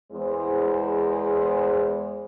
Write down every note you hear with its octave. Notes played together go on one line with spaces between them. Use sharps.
E2 G#3 C5